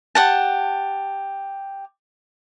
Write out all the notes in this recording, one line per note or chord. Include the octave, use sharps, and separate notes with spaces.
G4 F#5 A5